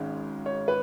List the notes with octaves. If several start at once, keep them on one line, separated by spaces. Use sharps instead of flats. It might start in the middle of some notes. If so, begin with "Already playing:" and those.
Already playing: G#1 G#2 G#3 C#4
C#5
B4